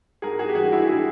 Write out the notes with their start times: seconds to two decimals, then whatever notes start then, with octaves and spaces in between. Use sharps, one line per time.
0.22 G#2 G#4 A#4
0.39 F#4 G#4
0.49 G4
0.55 E3 G3 F#4 G#4
0.72 E4 F#4
0.87 F#4 G#4